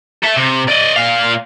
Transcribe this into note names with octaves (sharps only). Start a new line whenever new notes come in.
A4 E5
C3
D5 D#5
A#2 F5